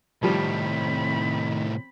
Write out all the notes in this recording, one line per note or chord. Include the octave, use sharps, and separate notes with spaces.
A2 C3 D#3 F3 G3 C4 B5